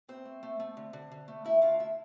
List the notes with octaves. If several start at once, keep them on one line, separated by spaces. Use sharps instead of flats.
A2 C4 C5
A3
A3
A3
D3
D3
D3
A3
A3 E4 E5
D3 F4 F5
D3 E4 E5